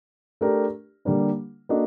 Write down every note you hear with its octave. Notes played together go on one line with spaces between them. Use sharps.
A3 D4 G4 A#4 D5
D3 G3 A#3 D4
A#3 D4 F#4 A4 D#5